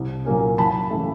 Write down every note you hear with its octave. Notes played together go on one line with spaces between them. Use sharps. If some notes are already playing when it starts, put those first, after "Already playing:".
Already playing: C2
A#2 F#3 A#3 C#4
F#1 A5 B5
C#3 E3 A3